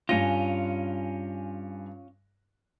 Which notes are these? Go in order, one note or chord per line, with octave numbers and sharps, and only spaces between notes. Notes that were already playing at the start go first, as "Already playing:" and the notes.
G2 C#4 F4 G#5 A#6